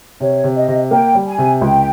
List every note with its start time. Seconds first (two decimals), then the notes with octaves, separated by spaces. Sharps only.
0.20 C3 C#5
0.44 C3
0.56 D#5
0.68 C3
0.91 A#3 G5
1.15 G3
1.26 G#5
1.38 C3
1.61 C#2 G5